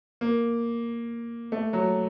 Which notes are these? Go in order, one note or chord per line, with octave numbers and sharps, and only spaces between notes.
A#3
A3
F#3